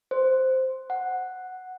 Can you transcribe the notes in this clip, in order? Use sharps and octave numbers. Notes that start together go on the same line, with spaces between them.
C5
F#5